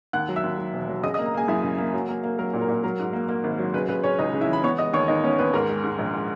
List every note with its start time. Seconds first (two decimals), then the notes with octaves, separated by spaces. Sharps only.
0.13 D#2 F#5 F#6
0.29 F#3
0.36 E5 E6
0.43 D#2
0.58 F#3
0.73 E1
0.89 F#3
1.03 C#3 D#5 D#6
1.14 D#5 D#6
1.19 A#3
1.26 A#5
1.34 A#3 G#4 G#5
1.48 F#2 E4 E5
1.64 C#3
1.78 A#3
1.93 F#3
2.09 A#3
2.24 A#3
2.39 F#3 A#4
2.53 A#2
2.61 A#4
2.68 A#2
2.84 F#3 A#4
2.99 G#2
3.13 A#3
3.28 A#3
3.44 G#1
3.59 F#3
3.73 C#3 B4
3.88 C#3 B4
4.04 C#3 C#4 C#5
4.19 C#2 D#4 D#5
4.33 C#3
4.41 E4 E5
4.49 E3 B5
4.64 B3 C#5 C#6
4.78 G#3 D#5 D#6
4.93 D#2 C#5 C#6
5.08 D#2 D#4 D#5
5.23 B3 C#4 C#5
5.39 D#2 B4
5.53 G#2 A#4
5.69 G#3
5.83 G#2
5.99 A#1
6.14 G#3